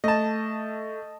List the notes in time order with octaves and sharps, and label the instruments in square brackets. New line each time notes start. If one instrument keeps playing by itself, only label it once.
[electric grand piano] A3 [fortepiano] D#5 A5